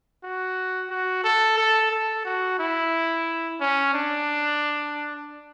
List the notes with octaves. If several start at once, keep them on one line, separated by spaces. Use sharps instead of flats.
F#4
F#4
A4
A4
A4
F#4
E4
C#4
D4